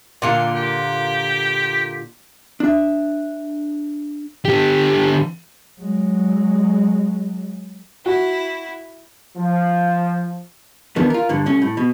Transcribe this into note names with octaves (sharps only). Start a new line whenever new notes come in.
A#2 D3 F4
G4
D4 E5
D3 G4
F#3 G#3
E4 F#4
F3
E2 B2 D#3 B3 D4
F4 A#4
G2 A#2 D3
C2 A3 C#4
A2
B2